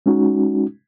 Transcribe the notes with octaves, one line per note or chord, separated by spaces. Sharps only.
G#3 C#4 D#4 F#4